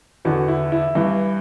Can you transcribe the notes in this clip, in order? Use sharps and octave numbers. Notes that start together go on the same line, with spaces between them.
E2 D3 F#4
E4
E4
G2 E3